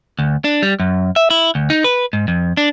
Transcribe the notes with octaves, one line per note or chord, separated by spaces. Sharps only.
D2
D4
G3
F#2
E5
E4
D2
D#4
B4
G#2
F2
D4